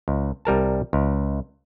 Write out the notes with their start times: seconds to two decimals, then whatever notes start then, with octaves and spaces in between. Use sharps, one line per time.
0.08 C#2
0.45 C2 G3 A#4 A5
0.93 C#2